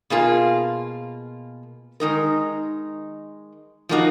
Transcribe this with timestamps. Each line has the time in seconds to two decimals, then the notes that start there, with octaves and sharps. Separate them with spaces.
0.10 B2 A#3 F4 G#4
2.00 D#3 G#3 D#4 A#4
3.89 F3 A#3 D#4 F#4